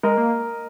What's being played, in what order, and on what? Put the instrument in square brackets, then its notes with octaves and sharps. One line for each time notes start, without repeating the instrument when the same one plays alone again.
[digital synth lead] G#3 [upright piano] A#4 D#5
[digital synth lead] A#3